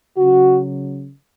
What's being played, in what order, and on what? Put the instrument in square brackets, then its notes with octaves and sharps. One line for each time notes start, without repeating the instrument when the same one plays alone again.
[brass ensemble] C#3 F#3 F#4